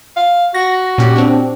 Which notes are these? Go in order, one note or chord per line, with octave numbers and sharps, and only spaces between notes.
F5
F#4 A#6
A#2 C#4 G4
C4 D4